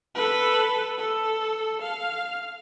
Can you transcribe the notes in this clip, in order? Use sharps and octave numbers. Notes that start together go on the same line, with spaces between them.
A4 B4
A4
F5